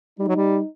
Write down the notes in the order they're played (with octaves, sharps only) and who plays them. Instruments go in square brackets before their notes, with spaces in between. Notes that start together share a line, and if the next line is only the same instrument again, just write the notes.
[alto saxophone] G3 [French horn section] D#4
[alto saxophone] F#3
G3